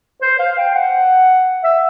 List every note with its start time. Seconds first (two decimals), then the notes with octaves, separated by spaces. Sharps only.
0.22 C5
0.39 F5
0.58 G5
0.74 F#5
1.64 E5